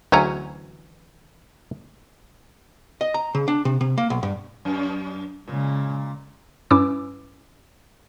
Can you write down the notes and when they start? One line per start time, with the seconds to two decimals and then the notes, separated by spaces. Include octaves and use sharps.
0.12 D2 E3 F#3 C#4 G#4 A#5
3.01 D#5
3.14 A#5
3.35 C#3
3.48 D4
3.65 C3
3.81 C3
3.98 A#3
4.10 B1
4.23 G2
4.65 F#2
5.48 A#2 C#3 G#3
6.71 G2 C#4 E4 B4 D6 E6